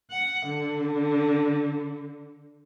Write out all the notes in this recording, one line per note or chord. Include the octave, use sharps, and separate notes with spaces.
F#5
D3